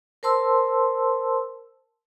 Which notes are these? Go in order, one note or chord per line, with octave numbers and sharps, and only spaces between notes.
A#4 C5 A5 C6 E6